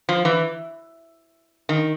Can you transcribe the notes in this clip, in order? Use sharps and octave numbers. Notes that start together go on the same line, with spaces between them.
F3
E3
D#3